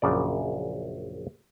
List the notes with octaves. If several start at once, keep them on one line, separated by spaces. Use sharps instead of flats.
A#1 F#2 C#3 D5